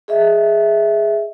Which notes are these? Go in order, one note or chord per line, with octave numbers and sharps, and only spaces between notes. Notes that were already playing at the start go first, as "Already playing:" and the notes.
G#4 D#5 E5